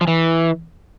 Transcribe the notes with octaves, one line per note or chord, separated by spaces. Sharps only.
F3
E3